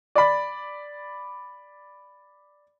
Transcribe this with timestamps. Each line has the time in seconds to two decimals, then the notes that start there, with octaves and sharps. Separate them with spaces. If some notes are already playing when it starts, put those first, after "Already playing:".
0.15 D5 B5